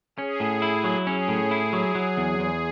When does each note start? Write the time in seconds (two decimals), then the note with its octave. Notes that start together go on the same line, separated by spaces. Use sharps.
0.18 C#4 G#4
0.40 A2
0.62 E4
0.84 F#3
1.06 C#4 G#4
1.28 A2
1.51 E4
1.73 F#3
1.95 F#3
2.17 E2
2.39 E2